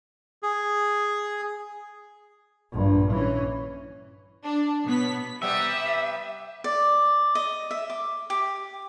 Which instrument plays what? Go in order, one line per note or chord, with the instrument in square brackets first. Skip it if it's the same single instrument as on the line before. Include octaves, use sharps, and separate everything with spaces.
[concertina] G#4
[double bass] A#1 G2
E3 C#4
[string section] D4
B2 B3 C#5 B6
[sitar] C3 G3 B3 [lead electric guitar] E5
[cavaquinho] D5
D#5
E5
D6
G4